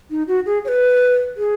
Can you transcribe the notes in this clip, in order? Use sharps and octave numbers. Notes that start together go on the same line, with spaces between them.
D#4
F#4
G#4
C#5
B4
G#4